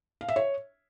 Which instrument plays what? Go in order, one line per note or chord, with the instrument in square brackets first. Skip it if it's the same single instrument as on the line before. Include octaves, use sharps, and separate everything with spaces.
[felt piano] F5
E5
C#5